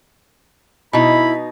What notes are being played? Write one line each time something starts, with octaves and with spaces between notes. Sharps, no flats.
B2 D#4 E4 B5